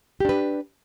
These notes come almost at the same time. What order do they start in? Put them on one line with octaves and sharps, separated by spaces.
G4 D4 B4